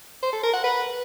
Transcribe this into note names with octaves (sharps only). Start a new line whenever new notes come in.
C5
A4
A#4
F#5
B4